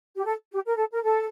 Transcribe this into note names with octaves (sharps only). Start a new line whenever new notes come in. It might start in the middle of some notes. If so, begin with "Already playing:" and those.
G4
A4
G4
A#4
A4
A#4
A4